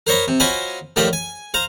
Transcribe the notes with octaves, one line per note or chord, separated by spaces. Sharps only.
A#4 C5 C#5 D#5 B5
C3
F#3 F4 C5 D#5 G#5 B5
A2 D#3 F3 G3 A#4 B5
G#5
C5 F5 A#5